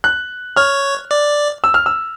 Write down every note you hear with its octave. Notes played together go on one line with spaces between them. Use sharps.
F#6
C#5 F6
D5
E6
F6
E6